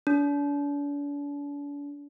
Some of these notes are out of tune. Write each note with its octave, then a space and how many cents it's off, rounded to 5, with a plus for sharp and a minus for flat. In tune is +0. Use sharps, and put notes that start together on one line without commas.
D4 -40